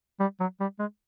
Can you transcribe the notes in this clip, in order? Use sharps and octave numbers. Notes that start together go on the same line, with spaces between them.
G3
F#3
G3
G#3